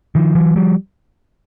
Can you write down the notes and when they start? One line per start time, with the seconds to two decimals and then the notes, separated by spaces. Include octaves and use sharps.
0.15 D#3 F3
0.35 E3 F#3
0.56 F3 G3